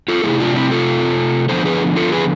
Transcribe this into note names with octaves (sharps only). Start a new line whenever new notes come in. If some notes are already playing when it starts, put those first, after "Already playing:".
F4 A4
C3 F3 A3 E4 G#4
D4 F4
C4 E4
F4 A4
D3 F3 B3 A4 C5
G#4 B4
F4 A4
G#4 B4